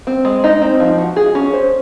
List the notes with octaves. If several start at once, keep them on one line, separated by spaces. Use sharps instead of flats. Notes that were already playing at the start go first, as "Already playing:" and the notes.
C4
G#3
D#4
C4
F3
F#4
G#4
C#4
C5